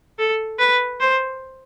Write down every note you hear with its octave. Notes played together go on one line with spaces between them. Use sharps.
A4
B4
C5